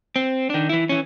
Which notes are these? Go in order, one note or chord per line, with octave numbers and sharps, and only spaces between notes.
C4
D#3 D4
E3 E4
E3 C#4